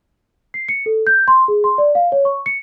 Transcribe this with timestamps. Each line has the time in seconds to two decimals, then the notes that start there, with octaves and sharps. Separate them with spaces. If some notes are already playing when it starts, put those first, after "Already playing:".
0.54 C7
0.69 C#7
0.86 A4
1.07 G6
1.28 C6
1.48 G#4
1.64 C6
1.78 D5
1.95 F5
2.12 C#5
2.25 C#6
2.46 C#7